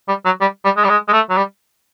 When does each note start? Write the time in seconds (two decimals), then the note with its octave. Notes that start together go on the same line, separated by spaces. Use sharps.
0.08 G3
0.25 F#3
0.41 G3
0.65 G3
0.77 G#3
0.84 G3
0.89 G#3
1.08 G#3
1.13 A3
1.29 F#3
1.37 G3